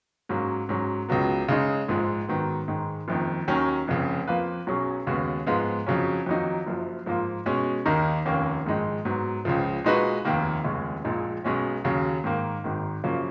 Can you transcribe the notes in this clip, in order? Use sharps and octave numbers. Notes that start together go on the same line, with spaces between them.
G#2 F#3 A#3 C#4
G#2 F#3 C#4
C#2 C#3 F#3 B3
C#3 G#3 D#4
A#1 G#2 F3 G#3
G#2 D#3 F#3 B3
G#2 D#3 G#3
F#1 F2 D#3
D#2 D#3 F#3 C#4
F1 F2 C#3
F2 F3 A#3 F4 B4
B1 B2 F#3 C#4 G#4
D#2 C#3 G#3 B3 F#4
G#2 F3 G#3 B3 F4
F2 C#3 F#3 C#4
F2 D#3 F#3 A#3 D#4
F#1 F#2 F3
G#2 F3 A#3 F4
B2 G#3 C#4
D#2 D#3 A#3 D#4 A#4
F1 D#2 D#3 A#3 C#4
A#1 G#2 D#3 G#3 D#4
G#2 F#3 B3
C#2 C#3 F3
A#2 G#3 D#4 F#4 B4
F1 D#2 D#3 A#3
F1 D#2 C#3 G#3 C#4
A#1 A#2 G#3 D#4
B1 B2 G#3 C#4
D#2 C#3 F#3
G#2 D#3 A#3
G#1 G#2 D#3
F#2 C#3 F3 A#3 C#4